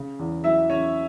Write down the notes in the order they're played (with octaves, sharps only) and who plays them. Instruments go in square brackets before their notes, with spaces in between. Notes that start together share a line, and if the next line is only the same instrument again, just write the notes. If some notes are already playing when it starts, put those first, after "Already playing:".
Already playing: [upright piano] C#3
E2
[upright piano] F#3 [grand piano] E4 E5
[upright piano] E2 [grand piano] C#4 C#5